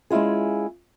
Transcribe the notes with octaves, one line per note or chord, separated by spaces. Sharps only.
G#3 C#4 E4 F4 G#4